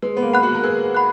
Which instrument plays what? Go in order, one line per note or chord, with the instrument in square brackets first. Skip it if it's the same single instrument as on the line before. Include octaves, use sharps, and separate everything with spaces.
[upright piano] G#3 [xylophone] B4
[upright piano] B3
A#3
[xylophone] F#5 B5 F#6
[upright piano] F#4
A#4
[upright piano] G#4 [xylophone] B4
[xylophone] F#5 B5 F#6